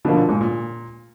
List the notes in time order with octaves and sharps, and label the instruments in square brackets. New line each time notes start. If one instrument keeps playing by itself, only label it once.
[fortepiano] B2 [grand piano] D3 F3 A#3
[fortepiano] A#2
G#2
A#2